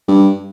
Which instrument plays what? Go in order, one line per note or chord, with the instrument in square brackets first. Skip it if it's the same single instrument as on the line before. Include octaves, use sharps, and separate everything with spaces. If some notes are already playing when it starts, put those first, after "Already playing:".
[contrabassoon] G2